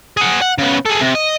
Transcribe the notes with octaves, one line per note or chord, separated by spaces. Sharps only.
G#4 F#5
F#5
C#3 B3
G#4 A4
C3
D#5